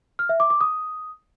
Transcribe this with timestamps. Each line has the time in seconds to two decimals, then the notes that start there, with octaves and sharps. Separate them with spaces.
0.19 F6
0.29 E5
0.40 D6
0.50 D6
0.61 D#6